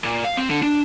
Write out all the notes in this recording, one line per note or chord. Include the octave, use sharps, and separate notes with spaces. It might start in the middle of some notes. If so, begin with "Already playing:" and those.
A#2
F5
C4
D3
D4